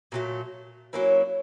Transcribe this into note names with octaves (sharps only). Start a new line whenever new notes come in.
A#2 F#3 A3
F#3 A#3 C#4 E4